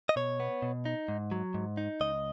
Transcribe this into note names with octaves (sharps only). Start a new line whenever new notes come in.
D#5
B2 C#5
B3
B2
D#4
G#2
F#3
G#2
D#4
C#2 D#5